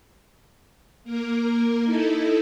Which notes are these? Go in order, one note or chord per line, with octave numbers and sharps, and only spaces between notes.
A#3 A#4
D#4 E4 A4